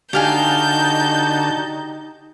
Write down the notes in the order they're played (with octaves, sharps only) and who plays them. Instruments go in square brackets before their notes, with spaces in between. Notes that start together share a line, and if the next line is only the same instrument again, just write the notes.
[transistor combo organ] D3 F#4 A5 [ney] D#4 [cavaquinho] G4 F5 G#5 [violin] G6